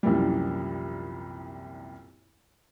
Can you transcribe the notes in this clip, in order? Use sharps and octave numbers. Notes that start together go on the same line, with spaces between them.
C2 F#2 A#2 E3 F3 G3